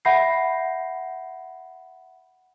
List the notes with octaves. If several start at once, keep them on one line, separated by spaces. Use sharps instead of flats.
E5 F#5 B5 G6 A#6 C7